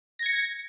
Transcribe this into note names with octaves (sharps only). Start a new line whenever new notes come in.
G#6 A#6 C#7